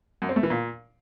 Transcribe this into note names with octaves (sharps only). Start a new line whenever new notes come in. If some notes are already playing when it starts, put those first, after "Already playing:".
F#2
C4
A3
E3
A#2